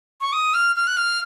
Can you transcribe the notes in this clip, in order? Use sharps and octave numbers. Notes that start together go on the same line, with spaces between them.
C#6
D#6
F6
F6
F#6
F6